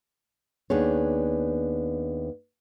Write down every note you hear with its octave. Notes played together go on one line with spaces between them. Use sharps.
D#2 B3 D4 G#4 C#5